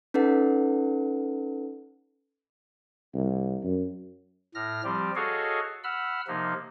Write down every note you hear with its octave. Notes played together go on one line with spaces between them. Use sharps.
C#4 D#4 A4 B4 F#5
C2
F#2
A2 F6 A#6
F3 G3 C4 G4
F#4 G#4 A4 C#5 D#5 F5
F#5 B5 E6 F6
C3 F3 A#3 D#4